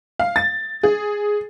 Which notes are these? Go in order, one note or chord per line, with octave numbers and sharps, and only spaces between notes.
F5
A6
G#4